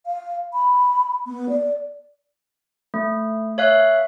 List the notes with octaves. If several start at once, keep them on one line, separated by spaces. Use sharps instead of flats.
F5
B5
B3
D5
A3
C#5 E5 F5 F#6